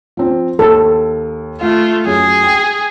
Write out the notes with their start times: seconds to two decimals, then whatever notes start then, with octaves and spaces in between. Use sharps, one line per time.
0.17 F3 C4
0.59 D#2 A4
1.61 A3 F4 F5
2.07 F#2 G#4
2.44 G5